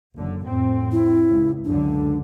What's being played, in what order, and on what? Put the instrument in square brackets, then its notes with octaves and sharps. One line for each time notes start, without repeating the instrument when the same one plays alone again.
[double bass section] F#1 D3
F2 A2 C4
[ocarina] E4
[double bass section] C#2
[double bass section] C#2 F#2 D3 [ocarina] D4